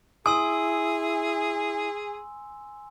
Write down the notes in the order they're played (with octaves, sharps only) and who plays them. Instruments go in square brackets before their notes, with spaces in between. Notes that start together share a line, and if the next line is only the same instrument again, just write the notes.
[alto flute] E4 [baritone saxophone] G#4 [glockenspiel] G#5 C6 E6 [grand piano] D#6